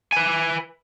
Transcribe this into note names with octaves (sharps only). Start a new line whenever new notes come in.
B4 G#5